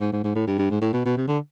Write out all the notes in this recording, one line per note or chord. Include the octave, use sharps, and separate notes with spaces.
G#2
G#2
G#2
A2
G2
G2
G#2
A2
B2
B2
C3
D3